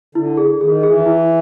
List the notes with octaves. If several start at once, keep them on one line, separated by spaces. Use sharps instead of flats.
D3 E4
G#4
D#3 G#4
E3 G#4
E4